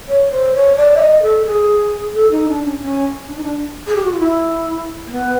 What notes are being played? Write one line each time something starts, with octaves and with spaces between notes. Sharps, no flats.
C#5
C5
C#5
D5
E5
D#5
A4
G#4
A4
D#4
D4
C#4
C#4
D4
D#4
D4
G#4
G4
F#4
F4
E4
A#3
B3